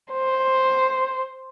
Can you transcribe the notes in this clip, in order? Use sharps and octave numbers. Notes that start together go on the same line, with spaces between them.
C5